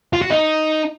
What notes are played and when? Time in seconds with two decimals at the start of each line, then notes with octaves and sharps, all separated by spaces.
0.13 F4
0.22 F#4
0.31 D#4